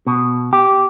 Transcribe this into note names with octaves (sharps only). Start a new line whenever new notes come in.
B2
G4